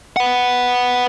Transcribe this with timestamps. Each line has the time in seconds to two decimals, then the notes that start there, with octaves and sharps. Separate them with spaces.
0.16 B4 F#5